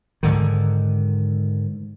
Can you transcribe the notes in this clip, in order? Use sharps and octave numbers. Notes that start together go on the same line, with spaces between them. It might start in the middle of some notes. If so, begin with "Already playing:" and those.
G#2 D3 D#3